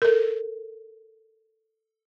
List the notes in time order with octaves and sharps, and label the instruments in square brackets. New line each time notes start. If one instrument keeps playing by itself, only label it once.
[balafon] A4 A#4